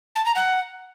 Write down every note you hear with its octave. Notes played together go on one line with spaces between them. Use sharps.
A5
A#5
F#5